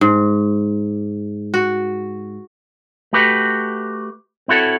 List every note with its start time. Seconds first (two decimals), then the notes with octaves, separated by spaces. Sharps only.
0.01 G#2
1.54 F#4
3.13 A3 F#4 G4 B4
4.48 C4 E4 F#4 A4 C#5